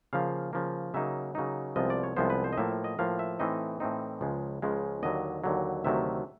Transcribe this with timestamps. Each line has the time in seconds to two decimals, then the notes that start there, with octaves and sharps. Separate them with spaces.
0.13 C#3 F3 A#3 F5
0.53 C#3 F3 A#3
0.94 C#3 F#3 A#3 D#4 E5
1.35 C#3 F#3 A#3 D#4
1.76 C2 C3 F3 G#3 B3 D#5
1.90 D5
2.03 C#5
2.16 C2 C3 F3 G#3 B3 C5
2.30 B4
2.44 C5
2.53 D#5
2.57 A2 F3 A#3 E5
2.84 D#5
2.99 A2 F3 A#3 F5
3.19 E5
3.39 A2 E3 A3 C4 D#4 D#5
3.80 A2 E3 A3 C4 D#4
4.21 C#2 C#3 F3 G#3
4.62 C#2 C#3 F3 G#3
5.03 D#2 D3 F#3 D#5
5.44 D#2 D3 F#3
5.84 D2 C3 D#3 F#3 A3 E5